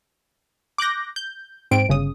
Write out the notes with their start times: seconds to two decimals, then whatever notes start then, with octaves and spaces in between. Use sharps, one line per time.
0.78 D6 F#6 G6 A#6
1.16 G6
1.71 G#2 C4 D7
1.89 G1 C#3 D#6